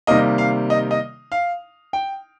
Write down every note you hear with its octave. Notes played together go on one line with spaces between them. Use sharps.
C3 D#3 G3 A#3 D#5
F5
D#5
D#5
F5
G5